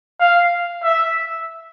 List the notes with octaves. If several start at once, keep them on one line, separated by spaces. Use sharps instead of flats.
F5
E5